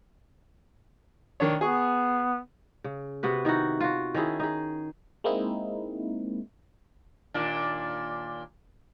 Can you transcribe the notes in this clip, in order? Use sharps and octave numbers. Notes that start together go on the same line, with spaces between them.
D#3 D4 C#5
B3 G#4 C#6
C#3
C3 B3 F#4 B4
D#3 D#4 E4 F#4
F4 F#4
D#3 C#4 E4 G#4
D#4 G#4
G#3 A#3 C4 D#4 E4
D#2 A#2 D4